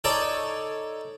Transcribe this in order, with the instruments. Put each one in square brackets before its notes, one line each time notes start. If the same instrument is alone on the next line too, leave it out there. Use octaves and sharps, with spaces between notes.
[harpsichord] D#4 A4 C#5 D5